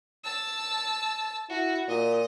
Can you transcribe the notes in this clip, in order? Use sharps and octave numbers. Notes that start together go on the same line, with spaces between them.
A5 E6
E4 F#4
A#2 D#5